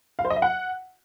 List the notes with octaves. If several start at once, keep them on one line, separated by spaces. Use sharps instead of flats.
F5
C5
D#5
E5
F#5